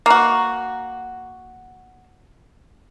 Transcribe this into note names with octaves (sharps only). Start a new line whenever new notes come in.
A#3 F#4